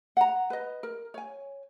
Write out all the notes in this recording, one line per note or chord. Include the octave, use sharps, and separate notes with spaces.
F#5 A#5
B4 D#5
A#4
C#5 G#5